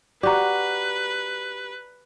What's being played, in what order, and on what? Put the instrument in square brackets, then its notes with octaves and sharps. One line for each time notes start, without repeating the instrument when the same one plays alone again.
[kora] F#4 G4 [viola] B4 [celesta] D5 A#5